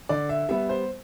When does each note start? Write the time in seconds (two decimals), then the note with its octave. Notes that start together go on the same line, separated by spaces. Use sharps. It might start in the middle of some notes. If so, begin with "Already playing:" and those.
0.09 D3 D5
0.29 E5
0.49 G3 B3 E5
0.69 C5